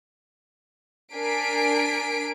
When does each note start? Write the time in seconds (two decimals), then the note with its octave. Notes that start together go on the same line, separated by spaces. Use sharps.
1.15 D4 A#4 G#5 B6 C7 D7